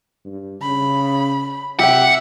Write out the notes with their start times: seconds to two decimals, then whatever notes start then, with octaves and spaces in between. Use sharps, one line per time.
0.25 G2
0.61 C#3 B5
1.79 C3 G4 E5 F#5 G5